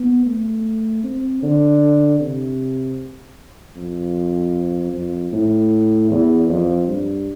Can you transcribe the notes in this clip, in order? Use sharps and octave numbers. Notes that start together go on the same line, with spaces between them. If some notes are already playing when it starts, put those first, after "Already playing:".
Already playing: B3
A3
C4
D3
C3
F2
F2
A2
E2
F2
G2